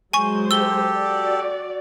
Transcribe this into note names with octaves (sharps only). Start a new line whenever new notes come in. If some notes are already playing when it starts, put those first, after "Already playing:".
F#3 G#3 C5 G#5 C#6
G4 A4 E6 G7
F#4 D5